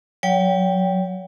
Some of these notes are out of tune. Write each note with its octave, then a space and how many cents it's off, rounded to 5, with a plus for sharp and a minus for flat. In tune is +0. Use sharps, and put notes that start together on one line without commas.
F#3 -20 C#5 +40 G5 +0